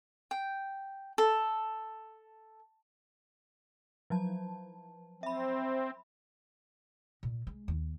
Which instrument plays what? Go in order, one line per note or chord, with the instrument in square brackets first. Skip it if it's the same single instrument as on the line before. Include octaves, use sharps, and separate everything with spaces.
[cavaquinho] G5
A4
[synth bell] F3 F#3 A5
[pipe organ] C4 [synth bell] E5 B5
[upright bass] A#2
G#3
D#2